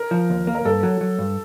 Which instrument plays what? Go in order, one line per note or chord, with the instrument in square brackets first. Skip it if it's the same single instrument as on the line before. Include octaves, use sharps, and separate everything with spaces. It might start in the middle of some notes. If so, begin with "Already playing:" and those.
Already playing: [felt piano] A#4
[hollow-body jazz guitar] F3
D#2
A#3
[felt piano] A#4
[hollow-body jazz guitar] G2 [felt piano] A4
[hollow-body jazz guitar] F#3
F#3
G2